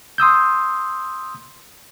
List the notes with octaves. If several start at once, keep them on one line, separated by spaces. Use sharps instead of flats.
C6 D#6 E6 G6